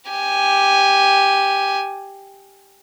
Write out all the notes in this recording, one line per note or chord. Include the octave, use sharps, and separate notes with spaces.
G4 G#5